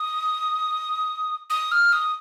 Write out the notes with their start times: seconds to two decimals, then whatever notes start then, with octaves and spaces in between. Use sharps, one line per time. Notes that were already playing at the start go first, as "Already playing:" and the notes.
Already playing: D#6
1.50 D#6
1.72 F6
1.93 D#6